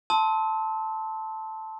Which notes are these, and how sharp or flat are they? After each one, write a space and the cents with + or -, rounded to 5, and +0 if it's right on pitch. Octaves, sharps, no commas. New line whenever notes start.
A5 +0 C6 +0 E6 -40